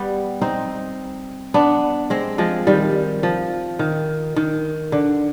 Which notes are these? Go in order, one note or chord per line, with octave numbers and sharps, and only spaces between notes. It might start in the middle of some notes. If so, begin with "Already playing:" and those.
Already playing: G3 B3
C4 D#4
B3 D4
G#3 C4
F3 G#3
D#3 G3
F3
D#3
D#3
D3